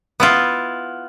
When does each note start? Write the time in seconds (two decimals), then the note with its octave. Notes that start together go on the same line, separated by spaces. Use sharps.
0.20 B3 E4 F4